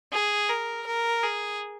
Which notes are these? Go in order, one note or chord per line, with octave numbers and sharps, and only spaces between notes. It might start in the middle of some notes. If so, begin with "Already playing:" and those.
G#4
A#4
A#4
G#4